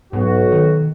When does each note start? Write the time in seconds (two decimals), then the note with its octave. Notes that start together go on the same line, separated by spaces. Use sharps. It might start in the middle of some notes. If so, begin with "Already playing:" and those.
0.13 B1 G#2 F#4
0.52 D#3